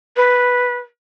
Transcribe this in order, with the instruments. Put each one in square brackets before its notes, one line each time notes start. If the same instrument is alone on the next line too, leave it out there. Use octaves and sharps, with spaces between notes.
[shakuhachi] B4